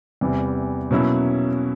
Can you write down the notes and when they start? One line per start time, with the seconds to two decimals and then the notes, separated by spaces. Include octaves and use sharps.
0.21 E2 C3 E3 G3
0.91 B2 F#3 A#3 C#4 E4